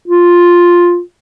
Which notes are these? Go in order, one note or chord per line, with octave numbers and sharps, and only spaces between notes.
F4